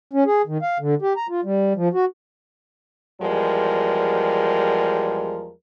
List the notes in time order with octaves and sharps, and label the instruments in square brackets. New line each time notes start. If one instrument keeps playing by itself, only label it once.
[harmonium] C#4
G#4
D#3
F5
D3
G4
A#5
F4
G3
F3
F#4
[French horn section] E2 F3 G3 G#3 A#4